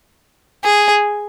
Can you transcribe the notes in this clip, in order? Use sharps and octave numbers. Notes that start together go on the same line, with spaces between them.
G#4